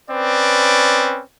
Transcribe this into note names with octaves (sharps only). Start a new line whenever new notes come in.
C4 C#4 B4 D5